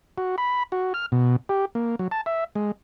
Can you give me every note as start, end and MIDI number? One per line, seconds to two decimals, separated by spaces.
0.18 0.36 66
0.38 0.63 83
0.72 0.93 66
0.94 1.06 89
1.12 1.36 47
1.49 1.65 67
1.75 1.96 58
1.99 2.08 54
2.11 2.21 81
2.26 2.44 76
2.55 2.72 56